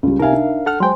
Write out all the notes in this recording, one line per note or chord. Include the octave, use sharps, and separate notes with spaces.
C#2 G3
C3 D#4 A#4 E5 F5 G#5
D4
A4 F#5 F6
F#3 G#3 C5 G5 G#5 C6